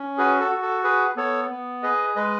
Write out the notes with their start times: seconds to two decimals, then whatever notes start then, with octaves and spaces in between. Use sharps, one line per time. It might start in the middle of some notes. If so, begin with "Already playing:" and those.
Already playing: C#4
0.18 F#4 G#4 B4
0.40 A4
0.51 F#4
0.62 A4
0.84 G#4 B4
1.17 B3 A4 C#5
1.51 B3
1.83 G#4 B4 D#5
2.16 G#3 B4 D#5